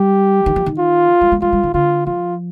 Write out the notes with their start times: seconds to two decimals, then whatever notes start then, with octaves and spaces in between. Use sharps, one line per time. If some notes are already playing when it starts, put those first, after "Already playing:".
Already playing: G3 G4
0.46 D#3
0.56 F3
0.66 D#3
0.78 F4
1.21 G3
1.32 G#3
1.42 G3 F4
1.53 G3
1.63 D#3
1.74 D3 F4
2.06 F3 F4